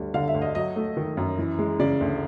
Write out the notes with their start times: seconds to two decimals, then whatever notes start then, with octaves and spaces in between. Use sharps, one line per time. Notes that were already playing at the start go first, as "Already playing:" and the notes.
Already playing: D2 G3
0.14 D3 F5
0.28 E5
0.34 D2
0.42 D#5
0.55 F#3 D#5
0.76 A3
0.97 D#3
1.17 F#2
1.39 E3
1.59 G#3
1.80 C#3 D5
2.01 D2